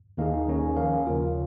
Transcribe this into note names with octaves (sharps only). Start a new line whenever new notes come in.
D#2 D#3 A#3 D#4 G#4
D#2 D#3 C#4 G#4
F3 C#4 A#4 F5
D#2 C#3 A#3 F4 C#5